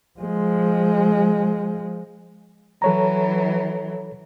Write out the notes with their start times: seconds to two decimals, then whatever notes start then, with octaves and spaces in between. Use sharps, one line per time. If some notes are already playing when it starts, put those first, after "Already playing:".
0.20 F3 G#3
2.82 E3 F#3 A4 C#5 A#5